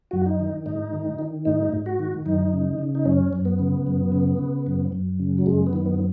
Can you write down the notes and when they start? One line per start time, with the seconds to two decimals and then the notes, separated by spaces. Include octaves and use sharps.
0.11 F#2 F#4
0.26 D#4
0.40 D#3
0.66 G#2 D#4
0.93 D#3
1.19 D#3
1.45 G#2 D#4
1.72 G#2
1.86 F#4
1.99 D#3
2.26 F#2 D#4
2.53 C#3
2.79 C#3
2.95 D#4
3.05 F#2 C#4
3.33 F#2
3.45 B3
3.59 C#3
3.87 F#2
4.12 C#3
4.39 C#3
4.67 F#2
4.92 F#2
5.19 C#3
5.38 F#3
5.46 F#2 G#3
5.67 B3
5.73 D#3
5.86 B3